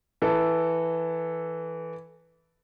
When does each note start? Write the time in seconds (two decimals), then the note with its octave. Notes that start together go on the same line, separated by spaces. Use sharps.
0.22 E3 A4